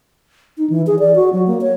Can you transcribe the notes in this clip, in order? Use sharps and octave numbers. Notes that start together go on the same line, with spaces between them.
D#4
E3
G#4
D5
F#4
F#3
A#3
C#5